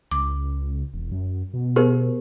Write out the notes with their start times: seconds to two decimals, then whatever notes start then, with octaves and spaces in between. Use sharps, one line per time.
0.11 C#2 D6
0.94 E1
1.11 F#2
1.53 B2
1.76 B3 G4 G#4 A#4 C5